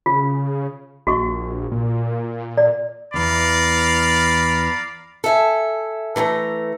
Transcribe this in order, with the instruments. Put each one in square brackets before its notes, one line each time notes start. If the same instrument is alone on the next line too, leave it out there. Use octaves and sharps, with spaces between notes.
[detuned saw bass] C#3 [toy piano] F4
[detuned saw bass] A#1 [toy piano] F#4 D#5 C#6
[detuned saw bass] A#2
[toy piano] D5
[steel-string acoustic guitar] E2 E3 [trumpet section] D5 F5 A#5 [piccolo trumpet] B5
[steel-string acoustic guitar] A4 E5 G#5
E3 A3 G#5 A#5